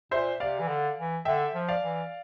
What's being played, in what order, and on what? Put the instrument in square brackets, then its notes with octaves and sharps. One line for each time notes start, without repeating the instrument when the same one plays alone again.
[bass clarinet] A#2 [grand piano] C5 E5
[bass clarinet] C3 [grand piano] D5 F5
[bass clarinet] E3
D3
E3
[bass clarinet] D3 [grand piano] E5 G5
[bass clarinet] F3
[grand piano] D5 F5
[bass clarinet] E3